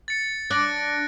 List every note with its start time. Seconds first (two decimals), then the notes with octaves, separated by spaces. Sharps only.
0.08 A6 C#7
0.50 D4 F#6 A#6 D7